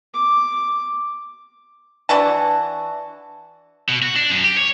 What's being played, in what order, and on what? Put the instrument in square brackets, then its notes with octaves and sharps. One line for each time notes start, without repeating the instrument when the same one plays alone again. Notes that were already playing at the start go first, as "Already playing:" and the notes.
[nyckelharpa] D6
[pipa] E3 D4 F#4 A5
[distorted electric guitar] B2
F#4
D4
F#2
G4
C#5